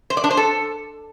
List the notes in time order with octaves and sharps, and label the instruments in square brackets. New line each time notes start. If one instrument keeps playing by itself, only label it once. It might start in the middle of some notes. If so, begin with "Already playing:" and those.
[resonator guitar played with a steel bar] C5
D5
D4
C5
A4